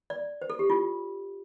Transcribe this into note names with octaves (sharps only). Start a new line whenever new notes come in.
D5
C5
A4
G4
F4